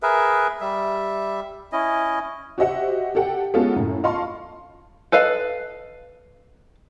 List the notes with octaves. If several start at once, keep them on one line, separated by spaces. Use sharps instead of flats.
G#4 A#4 B4 E5
G3 E5
C#4 E4 D#5
F#4 G4 C5 D#5 E5 F#5
G4 A4 F#5 G5
G#3 B3 C#4 F4 F#4 A4
F#2 A2
F4 D#5 F5 A5 C6 C#6
A4 B4 D#5 F5